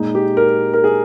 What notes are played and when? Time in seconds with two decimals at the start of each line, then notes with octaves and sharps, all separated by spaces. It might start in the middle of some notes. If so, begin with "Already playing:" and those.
Already playing: A#2 G#3 D#4
0.15 G4
0.37 A#4
0.74 A#4
0.84 G#4